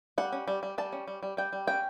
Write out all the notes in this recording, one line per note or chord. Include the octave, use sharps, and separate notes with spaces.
G3 F#5
C#4
G3
G3
G3 A5
C#4
G3
G3
G3 G5
G3
C#4 G5